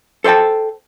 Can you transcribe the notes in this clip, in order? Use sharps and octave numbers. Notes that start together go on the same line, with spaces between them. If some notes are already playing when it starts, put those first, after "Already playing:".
A4 C5 D5 G5 A5